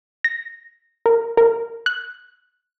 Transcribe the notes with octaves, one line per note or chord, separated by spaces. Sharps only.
A#6
A#4
A#4
F#6